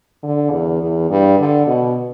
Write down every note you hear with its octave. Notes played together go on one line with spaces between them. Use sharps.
D3
E2
E2
G2
D3
B2